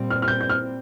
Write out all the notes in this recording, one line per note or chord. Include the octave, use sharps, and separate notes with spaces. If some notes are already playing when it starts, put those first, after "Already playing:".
Already playing: A#2 G3 C4
F6
F6
G6
G6
F6